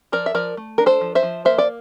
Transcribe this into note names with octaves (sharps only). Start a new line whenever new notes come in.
F3 A#4 D5
E5
F3 A#4 D5
A3
D4 A#4
A4 C5
F3
C5 E5
F3
A#3 C5 E5
D5